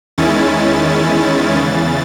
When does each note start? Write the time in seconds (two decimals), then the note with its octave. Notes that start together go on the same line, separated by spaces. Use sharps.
0.18 E2 D#3 G#3 C#4 E4 A6
1.53 E2 C#3 E3